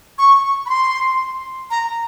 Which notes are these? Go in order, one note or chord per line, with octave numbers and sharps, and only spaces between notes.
C#6
B5
C6
A#5